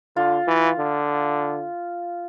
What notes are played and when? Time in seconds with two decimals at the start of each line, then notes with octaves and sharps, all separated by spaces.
0.16 D3 F4
0.48 E3
0.79 D3